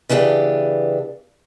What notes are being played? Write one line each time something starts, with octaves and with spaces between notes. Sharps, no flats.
C#3 E3 B3 D4 G4